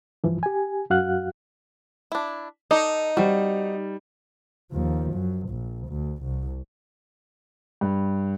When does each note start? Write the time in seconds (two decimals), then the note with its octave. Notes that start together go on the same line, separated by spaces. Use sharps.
0.24 C2 G2 E3 F3
0.43 G4 G#5
0.90 F#2 F#4 F5 F#5 F#6
2.12 D4 E4
2.71 D#4 A4 D5 D#5
3.17 G3 C4 F#4
4.72 D#2 F3
5.13 F#2
5.49 A#1
5.88 D2
6.23 C2
7.81 G2